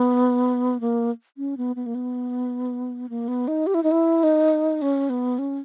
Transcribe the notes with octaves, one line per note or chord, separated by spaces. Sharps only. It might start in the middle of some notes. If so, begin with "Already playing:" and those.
Already playing: B3
A#3
C#4
B3
B3
A#3
B3
A#3
B3
D#4
G4
E4
D#4
E4
D#4
C#4
B3
C#4